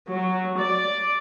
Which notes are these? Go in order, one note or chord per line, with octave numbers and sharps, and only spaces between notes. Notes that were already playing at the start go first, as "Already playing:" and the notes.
F#3
D5